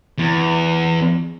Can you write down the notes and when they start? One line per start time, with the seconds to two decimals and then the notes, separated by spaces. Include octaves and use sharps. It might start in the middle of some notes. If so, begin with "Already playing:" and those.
0.18 E2